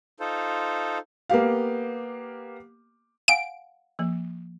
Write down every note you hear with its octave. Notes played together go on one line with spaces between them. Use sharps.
D#4 F4 A4 C5
A#3 B3 G4 F5
F5 F#5 G#5 D7
F3 A#3